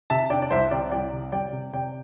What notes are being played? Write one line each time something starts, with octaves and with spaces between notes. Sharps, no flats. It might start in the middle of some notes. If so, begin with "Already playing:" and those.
C3 E5 A5
D4 D5 G5
D5
C2 C5 E5
C3 D5 G5
C2 D5 G5
C3
G3 D5 G5
C3
C3 D5 G5